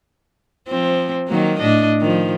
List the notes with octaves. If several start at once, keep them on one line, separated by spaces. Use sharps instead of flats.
F3 C4
D#3 F#3 A#3
A2 D4 D#5
D#3 F3